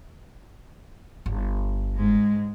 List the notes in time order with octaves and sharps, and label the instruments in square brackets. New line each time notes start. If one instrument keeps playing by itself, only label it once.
[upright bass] G1
[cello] G#2 G#3